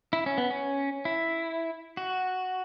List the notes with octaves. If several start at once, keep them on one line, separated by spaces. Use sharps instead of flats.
E4
C#4
B3
C#4
E4
F#4